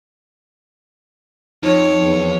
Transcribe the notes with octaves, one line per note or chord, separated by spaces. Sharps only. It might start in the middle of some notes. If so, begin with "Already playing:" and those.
F2 F3 D#4 C#5
E2